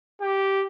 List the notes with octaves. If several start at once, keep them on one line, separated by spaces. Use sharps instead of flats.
G4